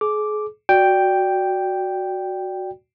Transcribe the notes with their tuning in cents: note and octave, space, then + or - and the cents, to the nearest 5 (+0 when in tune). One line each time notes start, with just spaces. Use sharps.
G#4 +35 D6 +0
F#4 +0 D5 +0 G5 +0